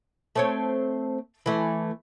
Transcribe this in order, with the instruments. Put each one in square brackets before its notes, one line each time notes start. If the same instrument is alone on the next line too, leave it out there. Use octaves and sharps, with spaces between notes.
[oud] A3 C4 C#5
E3 A3